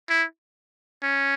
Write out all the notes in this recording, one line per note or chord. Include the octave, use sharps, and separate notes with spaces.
E4
C#4